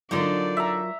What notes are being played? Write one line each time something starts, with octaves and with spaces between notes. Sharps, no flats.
D3 F#3 D4 D#4 F4 A#4 D5
E5 A#5